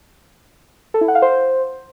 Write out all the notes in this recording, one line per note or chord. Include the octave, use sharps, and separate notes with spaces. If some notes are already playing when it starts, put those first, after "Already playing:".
A4
E4
F#5
F5
C5